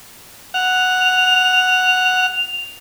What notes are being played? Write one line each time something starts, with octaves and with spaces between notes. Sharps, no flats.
F#5 F7